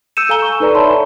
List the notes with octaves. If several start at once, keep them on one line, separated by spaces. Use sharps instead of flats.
E6 G6 C#7 D#7 E7
A4 F5 G#5 A#5 G7
C#6
D#4 A4 B4 D5 A#5
C#5 D5 E5 A5 B5 C6
G#5